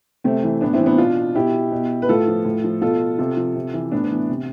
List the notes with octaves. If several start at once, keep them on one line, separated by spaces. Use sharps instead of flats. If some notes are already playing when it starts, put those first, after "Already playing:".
C3 A3 C4
E3
A2 B3 D4
C4 E4
E3
B3 D4
B2 D4 F4
B2 E4 G4
B2
B4
A2 F4 A4
F3
A2
F3
B2 F4 A4
C3 F4 A4
F3
C3
E3
A2 B3 D4
B3
E3
C3